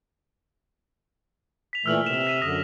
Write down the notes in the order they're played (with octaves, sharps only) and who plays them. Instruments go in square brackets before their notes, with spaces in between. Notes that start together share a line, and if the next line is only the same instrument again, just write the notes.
[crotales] B6 F7
[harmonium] A#2 E3 A3 [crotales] E6 F6 F#7
[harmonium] C3 [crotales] E7
[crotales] B6 D#7 F7
[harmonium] F#2 D3 [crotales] D#6 A#6